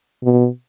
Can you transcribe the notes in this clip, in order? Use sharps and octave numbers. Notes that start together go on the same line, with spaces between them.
B2